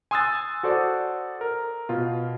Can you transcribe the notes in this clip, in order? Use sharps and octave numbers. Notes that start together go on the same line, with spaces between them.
G#5 C6 D#6 E6 F#6 A6
F#4 A4 C5 D5
A#4
B2 F4